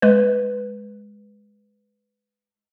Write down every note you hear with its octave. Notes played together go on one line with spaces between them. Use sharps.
G#3 B4